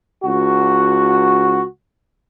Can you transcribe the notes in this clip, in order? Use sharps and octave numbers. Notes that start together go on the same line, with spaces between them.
C#2 F#4